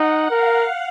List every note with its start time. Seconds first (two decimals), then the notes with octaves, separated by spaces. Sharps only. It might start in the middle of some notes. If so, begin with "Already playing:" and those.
Already playing: D#4 F#5
0.30 A#4 F5